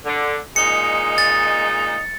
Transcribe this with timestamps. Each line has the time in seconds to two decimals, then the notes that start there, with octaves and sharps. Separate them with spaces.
0.05 D3
0.56 A#2 G#3 D#4 C#7
1.18 A6